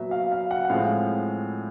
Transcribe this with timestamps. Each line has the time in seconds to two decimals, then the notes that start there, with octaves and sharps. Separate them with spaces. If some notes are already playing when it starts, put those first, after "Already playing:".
Already playing: A#2 F#3 B3 E5
0.11 F5
0.32 F5
0.51 F#5
0.65 F#5
0.70 A2 F3 G#3 C4 F5